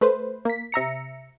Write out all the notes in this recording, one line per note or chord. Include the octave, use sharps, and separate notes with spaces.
A3 B4 C5
A#3 B6
C3 E5 A#5 C#7